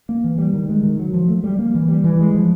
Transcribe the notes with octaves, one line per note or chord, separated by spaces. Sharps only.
A#3
E3
G3
D#3
G#3
D#3
F#3
F3
A3
G3
A#3
E3
G3
E3
G#3
F3